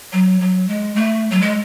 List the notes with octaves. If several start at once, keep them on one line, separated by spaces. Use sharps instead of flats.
F#3
F#3
G#3
A3
F#3
G#3